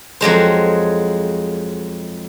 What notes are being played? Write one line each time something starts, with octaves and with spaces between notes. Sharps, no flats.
F2 F#3 G#3 C5